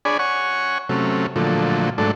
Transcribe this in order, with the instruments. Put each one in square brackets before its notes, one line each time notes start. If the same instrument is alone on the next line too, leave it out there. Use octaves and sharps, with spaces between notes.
[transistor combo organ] D4 G#4 C#5 D5 G#5 B5
C#5 F#5 G#5 C#6
C3 F#3 A3 C#4
A#2 D3 F3 F#3 A3
G#2 F#3 A3 D4 A4